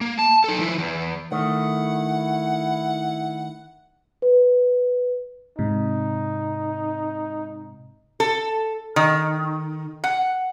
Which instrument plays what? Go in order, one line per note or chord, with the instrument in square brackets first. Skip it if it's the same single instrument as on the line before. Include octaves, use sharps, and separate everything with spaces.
[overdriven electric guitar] A#3
A5
D#4 A4
F3 E4
E2
[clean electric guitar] D#3 A3 [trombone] E4 [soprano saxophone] F#5
[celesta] B4
[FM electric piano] G#2 C3 [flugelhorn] D#4
[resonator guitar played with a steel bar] A4
D#3
F#5